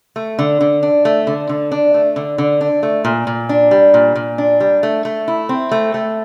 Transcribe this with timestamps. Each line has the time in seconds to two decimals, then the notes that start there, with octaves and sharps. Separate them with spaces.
0.16 A3
0.39 D3
0.61 D3
0.83 D4
1.05 A3
1.27 D3
1.49 D3
1.72 D4
1.94 A3
2.16 D3
2.38 D3
2.61 D4
2.83 A3
3.05 A#2
3.27 A#2
3.49 D4
3.71 G3
3.94 A#2
4.15 A#2
4.38 D4
4.60 G3
4.83 A3
5.05 A3
5.28 E4
5.49 C4
5.71 A3
5.94 A3